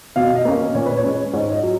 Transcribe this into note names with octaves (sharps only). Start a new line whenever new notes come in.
B2 F5
D#5
A#3 C#4
D#5
A#2 C#5
B4
C#5
G#3 C#4
G#2 C#5
D#5
F#3